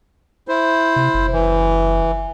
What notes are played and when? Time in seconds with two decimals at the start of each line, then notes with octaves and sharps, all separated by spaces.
0.48 E4 C5
0.96 C3
1.14 F#1
1.33 E3